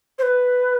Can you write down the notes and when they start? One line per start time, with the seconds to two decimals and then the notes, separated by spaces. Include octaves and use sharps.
0.19 C5
0.23 B4